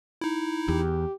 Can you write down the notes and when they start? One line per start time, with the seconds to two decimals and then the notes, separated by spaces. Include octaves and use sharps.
0.21 D#4 E4
0.68 E2 G4